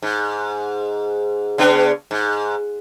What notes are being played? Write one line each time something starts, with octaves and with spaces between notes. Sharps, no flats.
G#2
C#3 B3 D4
G#2